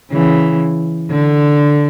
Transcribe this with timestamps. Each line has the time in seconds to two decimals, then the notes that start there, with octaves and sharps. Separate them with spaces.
0.12 C#3 E3
1.10 D3